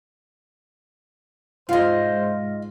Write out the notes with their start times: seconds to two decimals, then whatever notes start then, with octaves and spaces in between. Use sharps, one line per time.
1.69 G#2 F4 C5 D#5 F5